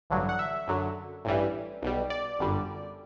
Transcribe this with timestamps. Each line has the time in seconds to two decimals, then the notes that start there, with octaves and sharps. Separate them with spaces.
0.10 A1 G2 D3 F#3
0.29 F#5
0.39 E5
0.68 F#2 D3 F#3
1.25 A1 G2 E3 G3
1.82 B1 B2 G3
2.10 D5
2.39 G1 F#2 D3 G3